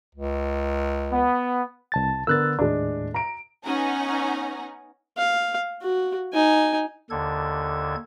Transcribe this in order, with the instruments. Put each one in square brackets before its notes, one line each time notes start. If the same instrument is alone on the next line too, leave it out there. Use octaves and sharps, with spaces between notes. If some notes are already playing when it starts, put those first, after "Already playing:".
[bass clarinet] C#2
[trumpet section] B3
[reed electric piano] C2 A5 A6
[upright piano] D3 B3 A#4 [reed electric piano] E6 F#6 A6
[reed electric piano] D#2 A2 [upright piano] G#3 D4
[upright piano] A#5 D7
[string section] B3 C#4 D#4 F#5 G#5 A#5
[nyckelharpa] F5
F#4
D#4 G#5
[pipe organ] D#2 D3 A4 G#6